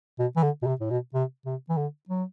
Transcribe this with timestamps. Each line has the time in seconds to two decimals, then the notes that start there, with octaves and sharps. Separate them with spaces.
0.19 B2
0.36 E3
0.43 D3
0.62 B2
0.67 C3
0.80 A2
0.91 B2
1.14 C3
1.46 C3
1.69 E3
1.77 D3
2.09 F#3